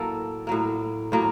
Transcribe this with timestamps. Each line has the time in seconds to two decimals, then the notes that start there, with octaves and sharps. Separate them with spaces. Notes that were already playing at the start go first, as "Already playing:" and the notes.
Already playing: A2 F#3 A#3 A4
0.47 A2 F#3 A#3
1.12 A2 F#3 A#3